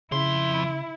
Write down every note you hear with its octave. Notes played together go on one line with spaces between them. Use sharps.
F2 C#3 E4 C6